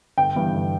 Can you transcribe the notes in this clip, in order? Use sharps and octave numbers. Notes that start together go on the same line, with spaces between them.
G1 G5
G2 E3 B3
G1